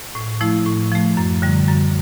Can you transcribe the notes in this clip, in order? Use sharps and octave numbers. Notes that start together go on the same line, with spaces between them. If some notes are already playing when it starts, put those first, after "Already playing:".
A2
F3 A3 E4
A2
F3 A3
F#2
D3 G3
F#2